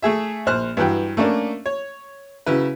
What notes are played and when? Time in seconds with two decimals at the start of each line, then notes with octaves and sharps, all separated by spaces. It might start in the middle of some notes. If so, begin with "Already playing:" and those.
0.02 A3 G#4 E5
0.46 A#1 C5 F6 F#6
0.77 G2 E3 F#3 G5
1.17 A3 A#3 C#4 D4
1.66 C#5
2.46 C#3 F#3 E4 B4